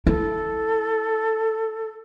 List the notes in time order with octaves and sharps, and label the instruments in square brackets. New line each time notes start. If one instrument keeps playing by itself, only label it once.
[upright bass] E4 [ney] A4